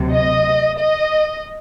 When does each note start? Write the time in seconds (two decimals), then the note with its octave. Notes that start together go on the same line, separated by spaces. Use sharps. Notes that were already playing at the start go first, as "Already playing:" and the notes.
Already playing: D2 C3 F#3
0.12 D#5
0.77 D#5